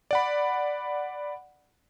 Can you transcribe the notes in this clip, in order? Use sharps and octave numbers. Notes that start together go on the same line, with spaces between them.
D5 F#5 B5